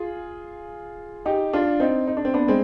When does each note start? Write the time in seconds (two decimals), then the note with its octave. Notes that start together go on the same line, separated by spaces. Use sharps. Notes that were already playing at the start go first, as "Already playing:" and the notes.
Already playing: F4 G#4
1.26 D#4 G4
1.53 D4 F4
1.80 C4 D#4
2.07 D#4
2.17 D4
2.25 C4
2.34 B3 D4
2.48 G#3 C4